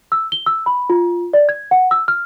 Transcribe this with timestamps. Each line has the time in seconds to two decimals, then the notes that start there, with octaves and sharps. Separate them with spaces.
0.12 E6
0.32 G7
0.46 E6
0.66 B5
0.90 F4
1.33 D5
1.49 G#6
1.71 F#5
1.91 E6
2.08 F6